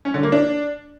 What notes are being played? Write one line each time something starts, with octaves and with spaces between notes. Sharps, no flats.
C#4
D3
A#3
D4